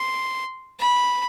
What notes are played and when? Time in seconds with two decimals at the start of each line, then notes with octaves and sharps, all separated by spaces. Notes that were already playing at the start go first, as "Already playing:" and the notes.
Already playing: C6
0.80 B5